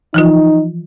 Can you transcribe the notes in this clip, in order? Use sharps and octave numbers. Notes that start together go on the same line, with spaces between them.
E3 F3 D#4 F4